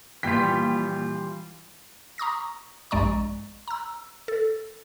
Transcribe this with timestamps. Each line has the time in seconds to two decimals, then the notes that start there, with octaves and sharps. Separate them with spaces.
0.23 A#1 E3 G3 F4 G5 B6
2.18 A#5 C#6 D#6 A#6
2.91 A#1 G2 G#3 D5 A#5 C#6
3.68 A#5 E6
4.28 A4